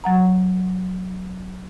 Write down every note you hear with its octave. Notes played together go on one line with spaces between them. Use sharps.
F#3 F#5 A#5